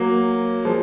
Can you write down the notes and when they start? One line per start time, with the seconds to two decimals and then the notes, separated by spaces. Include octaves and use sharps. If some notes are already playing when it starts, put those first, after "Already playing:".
Already playing: F#3 A#3
0.65 F3 G#3